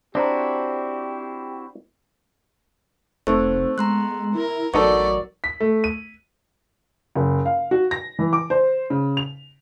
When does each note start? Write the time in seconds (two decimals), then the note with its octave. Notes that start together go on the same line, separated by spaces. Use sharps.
0.15 C4 D4 E4 F#4 G4 C5 A#5
3.27 F1 A3 C4 D#4 C5
3.78 G#3 B3 A#5 C6 F#6
4.35 E4 A#4
4.74 A1 F#3 B3 D#4 A4 A#4 D5 C#6
5.44 B6
5.60 A3
5.84 D#7
7.15 F#1
7.46 F5
7.71 F#4
7.91 A#6
8.19 E3
8.33 D6
8.50 C5
8.90 C#3
9.17 F7